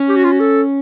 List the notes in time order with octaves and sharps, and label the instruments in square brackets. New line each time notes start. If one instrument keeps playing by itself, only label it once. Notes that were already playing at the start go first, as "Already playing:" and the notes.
Already playing: [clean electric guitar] C#4
[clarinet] G4
F#4
F4
F#4
A4